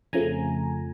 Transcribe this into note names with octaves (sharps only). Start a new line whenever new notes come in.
F2 C#3 F3 A3 G#5 A#5